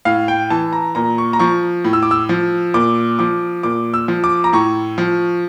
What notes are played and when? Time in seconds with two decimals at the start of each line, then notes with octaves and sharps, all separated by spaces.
0.05 A2 F5
0.28 G5
0.50 E3 A5
0.73 A#5
0.95 A#2 A#5
1.18 C#6
1.33 A#5
1.39 F3 C#6
1.84 A2
1.93 E6
2.03 D6
2.11 E6
2.29 F3
2.74 A#2 D6
3.19 F3 D6
3.63 A#2 D6
3.94 E6
4.08 F3
4.24 D6
4.44 A#5
4.53 A2 C#6
4.98 F3